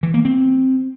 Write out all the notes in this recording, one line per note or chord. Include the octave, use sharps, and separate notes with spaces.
E3
A#3
C4